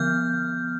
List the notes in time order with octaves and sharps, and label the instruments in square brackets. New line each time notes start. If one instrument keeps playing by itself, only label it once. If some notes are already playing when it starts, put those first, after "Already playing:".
Already playing: [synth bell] D3 F3 B3 F6 G6